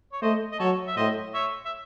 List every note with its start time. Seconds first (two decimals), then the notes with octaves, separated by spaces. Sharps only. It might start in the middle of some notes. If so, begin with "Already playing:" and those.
0.12 C#5
0.22 A3 C5 D#5
0.52 D#5
0.59 F#3 A4 C#5
0.87 E5
0.96 A2 C5 D#5
1.34 C#5 E5
1.65 E5